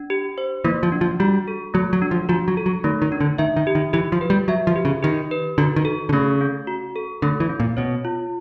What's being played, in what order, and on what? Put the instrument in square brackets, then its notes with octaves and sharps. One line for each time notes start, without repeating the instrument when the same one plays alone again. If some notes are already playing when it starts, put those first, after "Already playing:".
Already playing: [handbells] D4
G4
C5
[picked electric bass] E3 [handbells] A#3
[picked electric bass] F3
[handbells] D4
[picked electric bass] F3
[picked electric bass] G3 [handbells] F#4
[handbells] A4
[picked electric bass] F#3 [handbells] A3
[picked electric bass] F#3
[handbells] D4
[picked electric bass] F3
[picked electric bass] F3 [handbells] F#4
[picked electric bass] F#3
[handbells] A4
[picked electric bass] F#3
[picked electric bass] D#3 [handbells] A3
[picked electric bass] D#3
[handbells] D4
[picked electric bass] D3
[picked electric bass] D#3 [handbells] E5
[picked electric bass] D#3
[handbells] G4
[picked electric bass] D#3
[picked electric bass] E3 [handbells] G4
[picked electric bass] F3
[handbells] B4
[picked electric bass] G3
[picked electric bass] F#3 [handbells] E5
[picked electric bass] F3
[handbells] G4
[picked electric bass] C#3
[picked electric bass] D#3 [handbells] G4
[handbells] B4
[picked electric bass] D3 [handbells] F#4
[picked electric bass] D#3
[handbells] A4
[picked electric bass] D3
[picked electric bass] C#3 [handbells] A3
[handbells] C#4
F#4
A4
[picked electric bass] D3 [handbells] A3
[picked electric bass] E3
[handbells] C#4
[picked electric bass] A#2
[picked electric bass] B2 [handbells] C#5
[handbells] F4